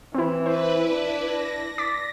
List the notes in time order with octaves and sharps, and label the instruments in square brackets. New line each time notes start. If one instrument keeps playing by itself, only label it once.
[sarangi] E3 [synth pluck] C4 E4
[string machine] E4 B4 [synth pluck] C5
[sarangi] D4
[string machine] A#6
[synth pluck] D6 A6 B6